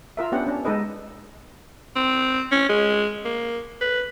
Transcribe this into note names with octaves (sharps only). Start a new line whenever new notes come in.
F4 A#4 E5
B3 C#4 D4 G4 F#5
C#4 D4
G#3 D#4 A4 B4 D#5
C4
C#4
G#3
A#3
B4